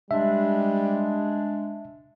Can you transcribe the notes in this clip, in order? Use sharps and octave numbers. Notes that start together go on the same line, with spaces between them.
G3 G#3 D4 E5